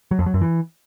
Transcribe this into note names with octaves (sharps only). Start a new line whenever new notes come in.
F#3
F2
F#3
F#2
E3